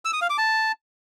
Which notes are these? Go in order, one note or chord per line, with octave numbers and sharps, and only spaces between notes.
E6
D#6
F5
D6
A5